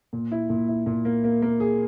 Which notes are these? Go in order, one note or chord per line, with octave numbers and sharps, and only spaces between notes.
A#2
E4
A#2
E4
A#2
A#3
A#3
A#3
G#4